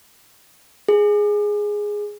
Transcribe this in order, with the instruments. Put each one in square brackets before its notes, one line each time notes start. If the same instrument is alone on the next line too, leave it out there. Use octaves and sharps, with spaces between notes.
[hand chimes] G#4